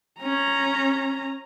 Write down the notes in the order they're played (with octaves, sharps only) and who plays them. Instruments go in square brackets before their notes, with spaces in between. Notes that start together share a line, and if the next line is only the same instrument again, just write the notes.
[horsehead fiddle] C#4 A#5